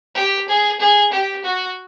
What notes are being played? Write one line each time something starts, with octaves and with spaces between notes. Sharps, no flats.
G4
G#4
G#4
G4
F#4